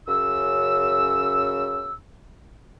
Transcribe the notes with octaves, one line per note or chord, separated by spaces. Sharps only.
F#2 C#3 E6